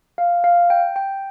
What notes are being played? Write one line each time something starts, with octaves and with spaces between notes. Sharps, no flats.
F5
F5
G5
G5